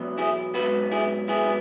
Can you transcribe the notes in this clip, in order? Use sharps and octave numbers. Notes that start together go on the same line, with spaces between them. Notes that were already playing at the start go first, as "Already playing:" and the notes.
Already playing: E2 B2 F#3
E4 G#4
G#2 F#3 B3 F#4 B4
E4 G#4
G#2 F#3 B3 E4 G#4